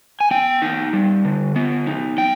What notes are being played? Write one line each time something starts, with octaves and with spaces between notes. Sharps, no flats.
G#5
B3 G5
D#4
G3
D3
B3
D#4
G3 G5